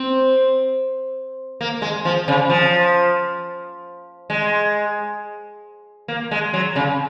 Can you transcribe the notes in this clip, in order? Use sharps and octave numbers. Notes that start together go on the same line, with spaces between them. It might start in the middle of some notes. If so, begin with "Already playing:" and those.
Already playing: C4
A#3
G#3
F3
C#3
F3
G#3
A#3
G#3
F#3
C#3